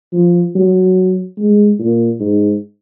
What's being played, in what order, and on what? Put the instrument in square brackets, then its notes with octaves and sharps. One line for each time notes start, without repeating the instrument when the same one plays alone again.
[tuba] F3
F#3
G#3
A#2
G#2